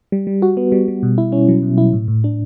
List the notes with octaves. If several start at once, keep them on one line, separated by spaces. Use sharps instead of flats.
G3
G3
F#4
B3
G3
G3
B2
E4
C#4
F#3
B2
E4
A2
A2
D4